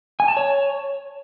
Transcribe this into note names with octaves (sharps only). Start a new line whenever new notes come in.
G#5
A5
C#5